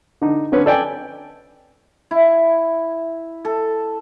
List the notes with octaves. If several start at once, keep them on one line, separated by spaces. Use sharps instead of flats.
D3 D#4
D3 C4 C#4 B4
A4 D5 G5 G#5
E4
A4